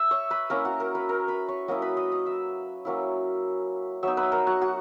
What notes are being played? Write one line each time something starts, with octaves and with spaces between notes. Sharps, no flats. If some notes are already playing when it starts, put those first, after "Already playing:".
Already playing: E5 E6
C#5 C#6
B4 B5
A#3 C#4 E4 A#4 A#5
F#4 F#5
A#4 A#5
B4 B5
A#4 A#5
B4 B5
C#5 C#6
F#3 A#3 C#4 E4 D#5 D#6
B4 B5
D#5 D#6
D#5 D#6
E5 E6
F#3 A#3 C#4 E4
F#3 B3 D#4 E5 E6
B4 B5
A#4 A#5
F#4 F#5
F#4 F#5